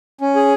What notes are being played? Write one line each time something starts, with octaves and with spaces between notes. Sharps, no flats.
C#4
G#4